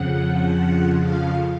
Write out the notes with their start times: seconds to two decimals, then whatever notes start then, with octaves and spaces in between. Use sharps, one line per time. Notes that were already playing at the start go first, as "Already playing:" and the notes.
Already playing: F2 C#3 F3 F#5
0.99 F5